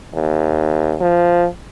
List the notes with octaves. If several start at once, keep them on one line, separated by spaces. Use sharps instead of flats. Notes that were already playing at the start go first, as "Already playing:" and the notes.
D#2
F3